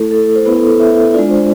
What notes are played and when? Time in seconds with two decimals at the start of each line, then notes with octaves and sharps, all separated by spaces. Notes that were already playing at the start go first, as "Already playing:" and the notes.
Already playing: A3 E4 A4
0.11 A4
0.36 C5
0.45 B3 E4 B4
0.56 A4
0.68 A4
0.80 E5
1.14 G#3 D4 F4 D5
1.30 C5